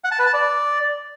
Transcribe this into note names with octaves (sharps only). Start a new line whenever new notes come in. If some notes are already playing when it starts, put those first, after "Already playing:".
F#5
A5
B4
A5
D5